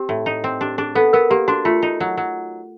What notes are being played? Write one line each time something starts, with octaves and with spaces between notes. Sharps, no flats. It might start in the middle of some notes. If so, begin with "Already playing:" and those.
Already playing: C4 G4
A2
D#4
C4
D4 G4
D4 G#4
B3 A4
B3 A#4
A#3 G4
D4 F#4
A3 F4
D#4
F#3
F#3